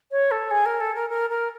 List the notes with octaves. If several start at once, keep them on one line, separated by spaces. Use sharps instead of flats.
C#5
A4
G#4
A#4
A4
A#4
A#4
A#4